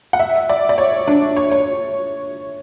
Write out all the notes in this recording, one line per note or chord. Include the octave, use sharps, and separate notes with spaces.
F#5
E5
D5
D5
C#5
D4
C#5
C#5